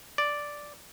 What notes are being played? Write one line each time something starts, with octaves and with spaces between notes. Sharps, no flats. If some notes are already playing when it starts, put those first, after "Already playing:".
D5